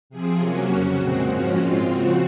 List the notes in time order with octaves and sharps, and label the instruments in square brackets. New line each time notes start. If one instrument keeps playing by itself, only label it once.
[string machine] C3 F3 C4 G#4
C3 F#3 A#3 C#4 F#4
F2 C#3 F#3 C#4 F#4
A#2 G#3 C4
G#2 F3 A#3 C#4
A#2 G#3 C4 F4
C#3 F3 C4 F#4